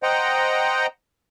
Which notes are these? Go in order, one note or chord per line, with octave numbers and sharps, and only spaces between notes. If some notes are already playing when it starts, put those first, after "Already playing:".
C5 D#5 F#5 G5 A#5